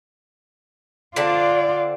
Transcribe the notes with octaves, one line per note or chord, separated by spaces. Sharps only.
D3 C4 D4 F4 D5